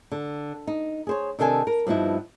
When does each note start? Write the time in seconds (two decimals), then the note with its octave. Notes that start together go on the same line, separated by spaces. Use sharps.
0.12 D3
0.67 D#4
1.07 G#4 C5 C#5
1.39 C3 D#3 D4 A4 E5 G#5
1.67 A#4
1.87 G2 F3 B3 D#4 E4